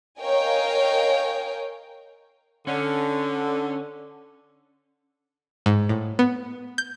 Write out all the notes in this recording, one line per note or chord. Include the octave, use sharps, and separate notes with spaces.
A#4 C#5 D#5 F5 G5 G#5
D3 C#4
G#2
A2
B3
G6